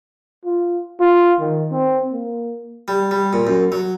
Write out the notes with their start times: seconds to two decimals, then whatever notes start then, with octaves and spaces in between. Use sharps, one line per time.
0.45 F4
1.00 F4
1.40 D#3
1.72 C4
2.12 A#3
2.88 G3
3.11 G3
3.33 A#2
3.47 F#2
3.72 F#3